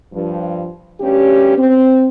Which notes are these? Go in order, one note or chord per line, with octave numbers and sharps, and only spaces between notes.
G2 F3
D2 G2 C#4 G4
C4